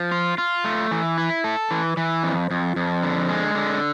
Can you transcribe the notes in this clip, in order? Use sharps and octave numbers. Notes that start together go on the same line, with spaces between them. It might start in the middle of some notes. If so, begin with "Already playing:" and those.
Already playing: F3
F4
F4
A3
E3
E4
A4
E3
E3
F2
F2
F2
D3
G#3
D3